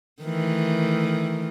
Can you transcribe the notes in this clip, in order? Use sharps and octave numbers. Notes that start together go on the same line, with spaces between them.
D#3 E3 A3